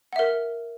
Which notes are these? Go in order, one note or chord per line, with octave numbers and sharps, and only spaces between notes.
A#4 E5 F#5